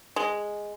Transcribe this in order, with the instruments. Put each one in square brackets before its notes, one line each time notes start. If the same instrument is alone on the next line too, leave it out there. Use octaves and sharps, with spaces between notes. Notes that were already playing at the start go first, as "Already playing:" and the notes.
[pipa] G#3